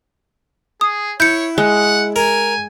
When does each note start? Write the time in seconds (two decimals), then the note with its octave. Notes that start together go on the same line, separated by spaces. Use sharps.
0.81 G#4 D#6
1.20 E4 C#5 G6 C#7
1.58 G#3 F#5
2.16 A#4 G#5